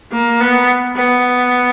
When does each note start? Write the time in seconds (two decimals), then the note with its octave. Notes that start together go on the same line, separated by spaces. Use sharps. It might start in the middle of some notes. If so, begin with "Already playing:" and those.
0.12 A#3
0.40 B3
0.96 B3